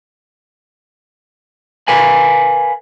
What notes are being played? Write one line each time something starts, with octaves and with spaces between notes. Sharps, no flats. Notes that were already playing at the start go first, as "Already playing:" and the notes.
A#4 B4 F5 G#5